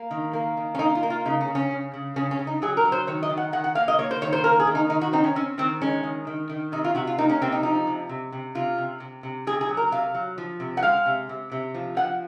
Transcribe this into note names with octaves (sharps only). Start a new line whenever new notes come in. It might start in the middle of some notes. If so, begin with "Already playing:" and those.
Already playing: A#3
D#3
A#3
D#3
C#4
A#3 D#4
F4
A#3
F4
C#3 D#4
C#4
C#3
C#4
C#3
C#3
C#3 C#4
C#4
C#3
D#4
F#3 G#4
A#4
F#3
C5
D#3 C#5
D#5
D#3
F#5
D#3 F#5
F#5
A#3 F5
D#5
A#3 C#5
C5
D#3 C#5
C5
A#3 A#4
G#4
D#3
D#4
D#3 D#4
F#4
C4 D#4
C#4
C4 C#4
D#3 C4
G#3 C#4
D#3
D#3
D#3
C3 D#4
F4
C3 F#4
F4
A#3 D#4
C#4
C3 C4
D#4
F3 D#4
C3
C3
C3
C3 F4
C3
C3
C3
C3 G#4
G#4
F#3
A#4
C3 F5
F#3
F3
C3
F#5
G#3 F5
C3
C3
C3
F3
F3 F#5